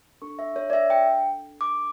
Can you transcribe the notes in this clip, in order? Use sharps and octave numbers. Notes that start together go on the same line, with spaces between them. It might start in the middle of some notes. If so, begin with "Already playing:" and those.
D4 A4 C#6
E5
C#5
D5
E5
G5
D6